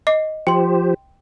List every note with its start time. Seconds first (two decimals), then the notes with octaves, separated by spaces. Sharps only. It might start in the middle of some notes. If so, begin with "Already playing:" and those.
0.07 D#5 D6 C7
0.47 F3 G4 C5 G5 C6